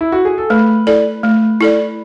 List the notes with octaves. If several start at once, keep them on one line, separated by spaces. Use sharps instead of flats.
E4
F#4
G#4
A4
A3 B4
E4 A4 D5
A3
E4 A4 D5